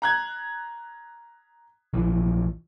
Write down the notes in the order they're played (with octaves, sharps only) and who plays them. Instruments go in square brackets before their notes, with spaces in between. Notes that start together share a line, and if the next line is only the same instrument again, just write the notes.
[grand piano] A#5 F#6 G#6
[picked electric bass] A#1 E3 F3